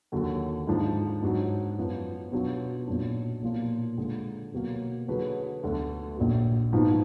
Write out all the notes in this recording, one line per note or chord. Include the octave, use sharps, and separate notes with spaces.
D#2 D3 F#3
G#2 F3 G#3 D4
G#2 F#3 D4 F#4
F#2 F3 B3
B2 F#3 B3 D4 F4
B1 A#2 F#3 D4
B1 A#2 F3 A#3 F4
D3 G#3 D4
B2 F#3 A#3
D3 F#3 D4 G#4 B4
D2 D3 F#3 B3
A#1 A#2 F#3
G#2 F3 B3 D#4 F#4